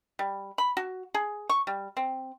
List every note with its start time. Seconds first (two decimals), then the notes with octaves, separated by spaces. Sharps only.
0.19 G3
0.58 B5
0.77 F#4
1.14 G#4
1.49 C#6
1.67 G3
1.97 C4